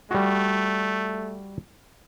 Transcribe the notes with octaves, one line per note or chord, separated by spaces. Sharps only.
G3 A3 F#4